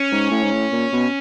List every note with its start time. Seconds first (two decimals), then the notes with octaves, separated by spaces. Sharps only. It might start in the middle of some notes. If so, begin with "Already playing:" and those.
Already playing: C#4
0.12 G#2
0.31 A2
0.44 G#2
0.52 A2
0.72 A#2
0.93 B2